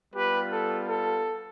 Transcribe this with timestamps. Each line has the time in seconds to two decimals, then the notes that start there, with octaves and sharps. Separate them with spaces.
0.14 G3 B3 F4 G4 B4
0.51 A4
0.88 A4